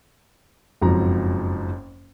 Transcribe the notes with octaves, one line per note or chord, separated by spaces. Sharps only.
F#1 F2 G#2 F3 F#3 A#5